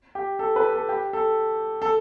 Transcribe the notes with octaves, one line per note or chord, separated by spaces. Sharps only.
G4
A4
B4
A4
G4
A4
A4